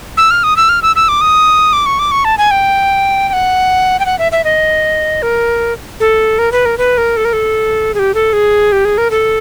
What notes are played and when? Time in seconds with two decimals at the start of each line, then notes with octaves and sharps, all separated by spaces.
0.17 E6
0.31 F6
0.43 D#6
0.57 E6
0.69 F6
0.82 E6
0.96 E6
1.09 D6
1.21 D#6
1.73 D6
1.86 C#6
1.99 D6
2.11 C#6
2.25 A5
2.38 G#5
2.51 G5
3.29 G5
3.33 F#5
4.00 G5
4.06 F#5
4.19 E5
4.32 E5
4.44 D#5
5.22 A#4
6.00 A4
6.39 A#4
6.52 B4
6.65 A#4
6.78 B4
6.98 A#4
7.17 A4
7.25 A#4
7.33 A4
7.94 G#4
7.99 G4
8.14 A4
8.33 G#4
8.72 G4
8.85 G#4
8.98 A#4
9.11 A4